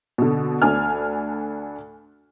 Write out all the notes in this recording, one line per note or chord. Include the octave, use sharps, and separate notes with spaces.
B2 D3
D2 D4 G#5 F6